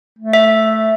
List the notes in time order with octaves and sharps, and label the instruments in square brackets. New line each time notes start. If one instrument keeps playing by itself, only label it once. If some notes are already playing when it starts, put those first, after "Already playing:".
[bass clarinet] A3
[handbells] E5